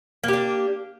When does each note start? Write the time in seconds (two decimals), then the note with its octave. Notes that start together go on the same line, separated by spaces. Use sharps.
0.24 A#3
0.28 G4
0.33 D4